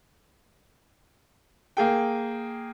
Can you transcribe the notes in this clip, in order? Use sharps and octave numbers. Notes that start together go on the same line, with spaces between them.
A#3 G#4 G5